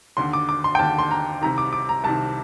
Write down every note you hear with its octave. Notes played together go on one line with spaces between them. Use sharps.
D#2 D3 C6
D6
D6
C6
G5
D#2 D3 A5
C6
A#5
C2 C3 D#3 A#5
D6
D6
A#5
C2 C3 D#3 A5